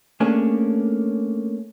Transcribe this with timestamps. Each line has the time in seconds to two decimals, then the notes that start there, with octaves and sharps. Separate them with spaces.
0.20 A3 A#3 C#4 D4 G#4